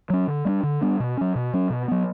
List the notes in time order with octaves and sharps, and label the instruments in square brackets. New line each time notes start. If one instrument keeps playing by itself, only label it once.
[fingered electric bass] F#3 C#4
D3
G3 B3 D4
D3
G3 B3 D4
B2
F#3 C#4
B2
F#3 C#4
B2
F#3 B3